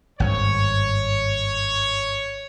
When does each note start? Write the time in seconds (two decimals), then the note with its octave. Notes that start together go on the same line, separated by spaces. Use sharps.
0.20 G#1 G2 C#5